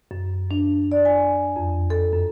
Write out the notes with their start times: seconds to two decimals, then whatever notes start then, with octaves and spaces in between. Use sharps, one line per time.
0.11 F#2
0.51 D4
0.92 D5
1.05 G#5
1.56 F2
1.90 A4
2.13 F#2